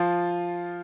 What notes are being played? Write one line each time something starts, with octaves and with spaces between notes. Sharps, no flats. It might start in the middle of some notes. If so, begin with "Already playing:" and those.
Already playing: F3 F4